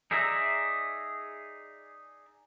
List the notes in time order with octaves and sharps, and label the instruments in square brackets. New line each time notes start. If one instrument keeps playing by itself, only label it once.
[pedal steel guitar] D#4 G#4 D5 E5 A#5